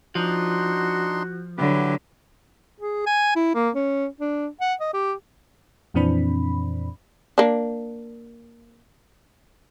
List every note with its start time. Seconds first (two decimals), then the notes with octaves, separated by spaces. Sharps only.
0.15 F3 D4 D#4 F#4 C6
1.58 D3 F#3 E4 G4 B4
2.80 G#4
3.06 G#5
3.36 E4
3.55 A#3
3.75 C#4
4.20 D4
4.61 F#5
4.80 D#5
4.94 G4
5.94 F2 A#2 E3 C4 D4 B5
7.38 A#3 D4